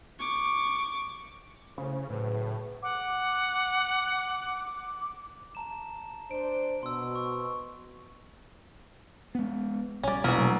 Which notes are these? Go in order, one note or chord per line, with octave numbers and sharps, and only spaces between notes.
C#6 D6
A2 C#3 C5
A2 F#3 G#4 B4
F#5 D6
A5 A#5 E7
D4 C5 D7
B2 C6 E6
C#6
G#3 B3
A#1 G3 C#4 D5
E1 F#4 A#4
F#3 A3 A#3